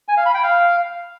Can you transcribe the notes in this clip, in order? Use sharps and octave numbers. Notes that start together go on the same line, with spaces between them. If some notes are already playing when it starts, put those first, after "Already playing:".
G#5
F5
B5
G5
F5